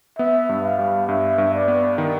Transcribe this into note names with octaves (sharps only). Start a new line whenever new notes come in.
B3 E5
G2
F5
G3
G2 E5
G2
D5
B3
D#3